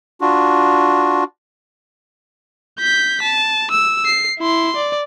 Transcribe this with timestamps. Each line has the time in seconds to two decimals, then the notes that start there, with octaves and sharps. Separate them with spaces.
0.21 D4 F4 F#4
2.80 G6 B6
3.23 A5
3.71 E6
4.06 C7
4.39 E4 C6
4.76 D5